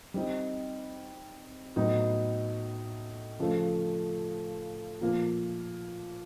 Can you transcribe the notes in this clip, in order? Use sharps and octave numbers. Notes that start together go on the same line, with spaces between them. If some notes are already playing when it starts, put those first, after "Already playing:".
G3 C4 D#4
A2 F#3 B3 D#4
C#3 F3 A3
A#2 F3 A#3